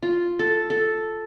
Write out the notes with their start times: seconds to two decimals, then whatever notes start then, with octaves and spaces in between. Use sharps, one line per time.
0.02 F4
0.39 A4
0.70 A4